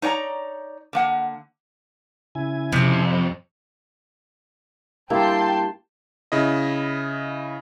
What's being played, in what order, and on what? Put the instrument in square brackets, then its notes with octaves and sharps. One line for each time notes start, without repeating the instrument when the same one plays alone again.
[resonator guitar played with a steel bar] D#4 C#5 D5 G5 A#5
D3 A#3 F#5
[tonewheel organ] C#3 E4 G#5
[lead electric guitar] F2 [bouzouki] C3
[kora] G2 A#3 E4 [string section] G5 A5 C6
[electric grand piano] C#3 E4 D#5